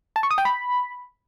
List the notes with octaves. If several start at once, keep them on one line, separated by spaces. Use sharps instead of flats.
A5
C#6
D#6
G5
B5